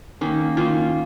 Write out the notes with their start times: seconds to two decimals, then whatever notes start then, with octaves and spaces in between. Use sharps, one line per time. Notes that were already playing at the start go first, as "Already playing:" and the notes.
0.21 D#3 A#3 C#4
0.57 D#3 A#3 C#4 F4